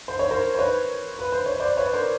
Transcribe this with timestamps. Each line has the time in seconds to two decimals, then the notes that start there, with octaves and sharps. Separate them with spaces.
0.08 C5
0.19 C#5
0.31 A#4 C5
0.55 C5
0.59 B4 C#5
1.19 B4
1.32 C5
1.46 C#5
1.60 C5 D5
1.77 B4 C#5
1.94 A#4 C5